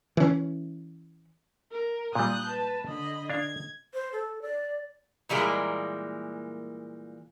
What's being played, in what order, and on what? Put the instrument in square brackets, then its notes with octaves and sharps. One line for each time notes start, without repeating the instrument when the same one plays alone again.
[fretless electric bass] E3 C#4
[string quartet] A#4
[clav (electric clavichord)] A#2 G3 [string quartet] D#6 F#6 G6
[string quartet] B4 A5
D3 D#5 B5
[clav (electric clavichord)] D4 F5 [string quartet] G#6
[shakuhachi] C5
A4
D5
[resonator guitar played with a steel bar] A#2 E3 G3 G#3 A#3